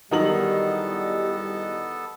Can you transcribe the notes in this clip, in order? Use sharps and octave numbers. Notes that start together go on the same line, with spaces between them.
E2 D#3 F#3 G3 B3 D#4 A4 F#7